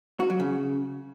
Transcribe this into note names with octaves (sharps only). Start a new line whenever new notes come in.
F#4
F#3
C#3